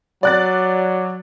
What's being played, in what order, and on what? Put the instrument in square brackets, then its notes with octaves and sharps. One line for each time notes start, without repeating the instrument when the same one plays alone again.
[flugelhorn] F#3 [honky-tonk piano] D5 F#6 A6